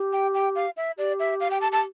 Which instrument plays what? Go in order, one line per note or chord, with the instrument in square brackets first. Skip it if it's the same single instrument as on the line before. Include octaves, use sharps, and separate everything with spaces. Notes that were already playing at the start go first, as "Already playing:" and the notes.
Already playing: [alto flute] G4
[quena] G5
G5
F5
E5
[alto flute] G4 [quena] D5
[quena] E5
F5
G5
A5
A5